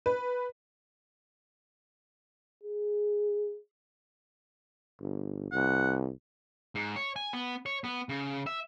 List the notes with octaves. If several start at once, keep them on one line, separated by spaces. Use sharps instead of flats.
B4
G#4
G1
C2 F#5
G#2
C#5
G#5
B3
C#5
B3
C#3
E5